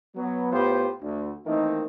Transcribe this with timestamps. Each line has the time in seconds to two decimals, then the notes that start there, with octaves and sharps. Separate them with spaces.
0.16 F#3 B3
0.52 A2 B3 F4 G4 B4 C5
1.02 D2
1.46 D#3 E3 A3 A#3 C4 D#4